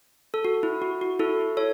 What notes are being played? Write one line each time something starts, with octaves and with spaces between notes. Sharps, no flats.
A4
F#4
E4
F#4
F#4
E4 A4
A4 C#5